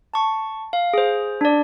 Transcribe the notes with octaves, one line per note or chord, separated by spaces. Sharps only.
A5 C#6
F5
G#4 C5
D4 D5